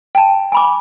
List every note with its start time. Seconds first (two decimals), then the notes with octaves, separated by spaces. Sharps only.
0.15 G5 A5
0.52 G#5 B5 D6